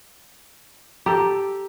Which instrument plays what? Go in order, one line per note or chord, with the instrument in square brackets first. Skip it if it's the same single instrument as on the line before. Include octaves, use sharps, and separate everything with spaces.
[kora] G4 A4 [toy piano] A#5